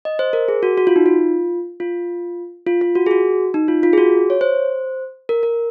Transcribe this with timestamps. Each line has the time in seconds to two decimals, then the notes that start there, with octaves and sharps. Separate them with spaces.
0.05 D#5
0.19 C5
0.33 A#4
0.48 G#4
0.63 F#4
0.78 F#4
0.87 F4
0.96 D#4
1.06 F4
1.80 F4
2.67 F4
2.81 F4
2.95 F#4
3.06 G#4
3.11 F#4
3.54 D#4
3.68 F4
3.83 F4
3.93 G#4
3.98 F#4
4.30 C#5
4.41 C5
5.29 A#4
5.43 A#4